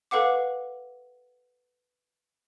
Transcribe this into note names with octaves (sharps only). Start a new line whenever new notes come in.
A4 B4 F5 F#5 D6